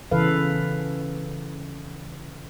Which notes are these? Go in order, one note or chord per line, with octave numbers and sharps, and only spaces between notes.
C#3 E3 A4 B4 F5